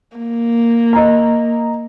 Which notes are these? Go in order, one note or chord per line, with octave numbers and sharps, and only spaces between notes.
A#3
D#5 A#5